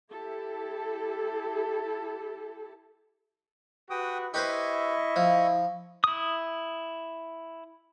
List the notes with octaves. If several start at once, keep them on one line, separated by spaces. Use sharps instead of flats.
E4 G4 A4
F#4 G4 B4 G5 D#6
E4 G4 B4 C5 D#5 C#6
F3
E4 D#6